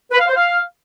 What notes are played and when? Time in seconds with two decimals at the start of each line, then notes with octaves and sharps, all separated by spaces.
0.11 B4
0.20 F5
0.28 C5
0.36 F5